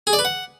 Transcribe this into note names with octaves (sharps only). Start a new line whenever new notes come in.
G#4
D5
B4
F#5